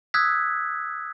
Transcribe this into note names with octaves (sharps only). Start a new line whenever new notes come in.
D#6 E6 F#6 G#6 B6